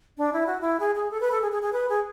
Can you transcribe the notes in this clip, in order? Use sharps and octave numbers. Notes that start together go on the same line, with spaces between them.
D4
E4
F#4
E4
G#4
G#4
A4
B4
A4
G#4
G#4
G#4
B4
G#4